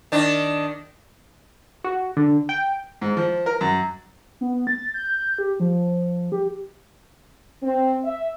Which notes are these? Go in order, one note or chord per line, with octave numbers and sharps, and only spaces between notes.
D#3 D4
F#4
D3
G5
G#2
F3
A#4
F#2
B3
A6
G6
G4
F3
G4
C4
E5